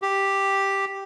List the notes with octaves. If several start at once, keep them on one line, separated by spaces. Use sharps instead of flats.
G4